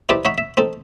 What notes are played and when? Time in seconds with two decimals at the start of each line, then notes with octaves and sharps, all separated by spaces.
0.09 D#4 E4 G4 B4 C5 D5
0.25 D#4 C#5 E5 F#5 B5
0.38 E5
0.57 C4 D#4 A4